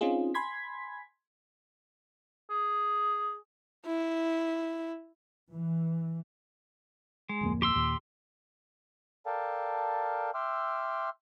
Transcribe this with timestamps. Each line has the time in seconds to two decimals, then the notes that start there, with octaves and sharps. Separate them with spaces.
0.01 C4 C#4 D#4 F4 G#4
0.34 G#5 B5 C6 G#6 B6
2.51 G#4
3.86 E4
5.51 E3
7.29 G#3
7.41 D1 F2 A#3
7.62 G4 C6 E6
7.75 D#2 A#2
9.26 A4 A#4 D5 F5 G5 A5
10.34 E5 G5 C6 D6 E6 F6